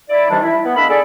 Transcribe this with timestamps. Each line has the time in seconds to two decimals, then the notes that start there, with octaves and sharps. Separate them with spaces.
0.10 E4 D5
0.29 C3 D#3 E3 G3 D4
0.43 E4
0.64 B3
0.76 G#3 A#3 D4 E5 F5 B5
0.89 G#4 A4 D5